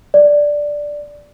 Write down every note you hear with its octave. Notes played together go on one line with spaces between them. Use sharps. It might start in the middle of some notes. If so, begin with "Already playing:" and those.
D5